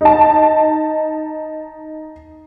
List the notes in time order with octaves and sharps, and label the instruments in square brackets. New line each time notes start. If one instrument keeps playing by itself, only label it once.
[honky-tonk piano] D#4 A5